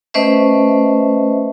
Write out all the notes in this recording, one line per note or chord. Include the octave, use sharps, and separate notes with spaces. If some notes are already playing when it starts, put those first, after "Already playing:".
A3 C#4 B4 C5 D#5 E5